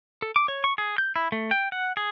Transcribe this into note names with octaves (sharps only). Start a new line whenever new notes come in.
A4
D6
C#5
C#6
G#4
G6
E4
A3
G5
F#5
G#4